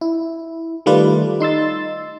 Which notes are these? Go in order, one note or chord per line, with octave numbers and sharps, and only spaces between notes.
E4
D#3 G3 A3 F4 B4 D5
D#4 C6 E6 A6